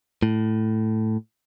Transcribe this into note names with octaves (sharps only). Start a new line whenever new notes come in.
A2